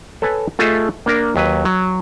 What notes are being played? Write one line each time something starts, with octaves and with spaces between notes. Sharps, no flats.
A4 B4 C#5 G#5 A5
A3 F4 G#4 A4 D#5 E5
A#3 D4 A#4
D#2 F#3 B4
F#3